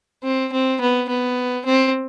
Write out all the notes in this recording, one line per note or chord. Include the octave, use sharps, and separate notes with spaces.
C4
C4
B3
B3
C4